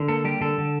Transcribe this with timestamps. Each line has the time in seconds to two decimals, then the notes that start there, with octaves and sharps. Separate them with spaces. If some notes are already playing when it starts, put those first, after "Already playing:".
Already playing: D3
0.08 A#3 A4
0.24 G3 G4
0.41 D3 A4
0.58 D3